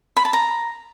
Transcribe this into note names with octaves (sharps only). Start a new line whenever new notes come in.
B5
A5
A#5